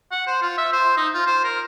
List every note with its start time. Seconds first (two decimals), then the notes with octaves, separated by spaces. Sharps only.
0.12 F#5
0.27 C5
0.42 F4
0.58 E5
0.73 C5
0.97 D#4
1.14 F4
1.27 C5
1.44 A#4